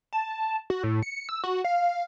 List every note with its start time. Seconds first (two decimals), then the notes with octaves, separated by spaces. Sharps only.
0.13 A5
0.70 F#4
0.83 A2
1.03 C#7
1.29 E6
1.44 F#4
1.64 F5